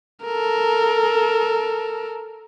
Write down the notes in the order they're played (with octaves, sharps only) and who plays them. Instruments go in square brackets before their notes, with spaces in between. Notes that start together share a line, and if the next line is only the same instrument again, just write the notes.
[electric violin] A4 A#4